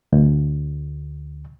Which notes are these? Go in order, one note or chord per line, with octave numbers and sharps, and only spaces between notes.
D2